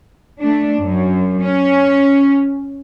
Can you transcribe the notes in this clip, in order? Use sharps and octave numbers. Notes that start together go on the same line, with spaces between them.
A3 D4
F#2
C#4